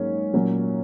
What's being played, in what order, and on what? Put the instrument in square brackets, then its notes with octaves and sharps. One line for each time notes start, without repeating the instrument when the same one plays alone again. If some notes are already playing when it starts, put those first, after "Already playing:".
Already playing: [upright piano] G#2 F#3 A#3 C#4
A#2 F#3 A#3 C#4